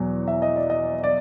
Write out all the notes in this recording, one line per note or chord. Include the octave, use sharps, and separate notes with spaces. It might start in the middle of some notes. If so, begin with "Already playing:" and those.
Already playing: E2 B2 F#3
E5
D#5
D5
D#5
D5